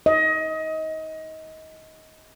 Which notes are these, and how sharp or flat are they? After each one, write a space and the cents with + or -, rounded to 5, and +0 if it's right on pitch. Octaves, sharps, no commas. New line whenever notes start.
D#5 +25